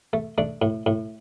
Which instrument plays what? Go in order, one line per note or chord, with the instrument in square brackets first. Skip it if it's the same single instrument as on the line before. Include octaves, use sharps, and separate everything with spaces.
[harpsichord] A3
A3 D4
A2
A2